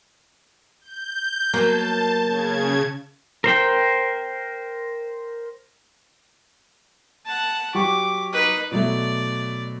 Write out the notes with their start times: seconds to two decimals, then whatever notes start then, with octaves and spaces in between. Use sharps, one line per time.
0.81 G6
1.54 F#3 A#3 B3 A5
2.21 C#3 G#6
3.44 A#4 C5 G5
7.25 F#5 A5
7.75 F#3 G4 C#6 D6
8.33 D#4 B4
8.72 B2 F#3 A3 D5